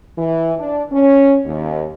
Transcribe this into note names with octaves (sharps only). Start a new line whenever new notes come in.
E3
D4
C#4
D#2